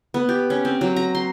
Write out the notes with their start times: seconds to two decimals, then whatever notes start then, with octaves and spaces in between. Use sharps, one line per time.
0.14 B3
0.29 G4
0.50 C#4
0.65 C4
0.81 F#3
0.96 A#5
1.15 C6